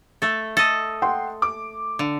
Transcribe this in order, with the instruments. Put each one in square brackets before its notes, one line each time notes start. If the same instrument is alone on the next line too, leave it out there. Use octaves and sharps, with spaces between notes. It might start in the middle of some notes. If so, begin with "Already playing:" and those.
[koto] A3 A4
A4 D#5
[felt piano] F#5 G5 C6
D6
[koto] D3